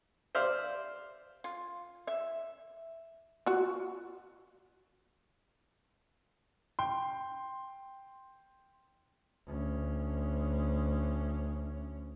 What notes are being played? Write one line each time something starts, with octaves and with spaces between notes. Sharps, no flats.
C5 D5 E5 F5
F4
E5
F4 F#4
G5 C6
D2 C#4